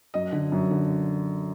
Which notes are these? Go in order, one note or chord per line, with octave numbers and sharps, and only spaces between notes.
F#2 D#5
D3
F#2
D3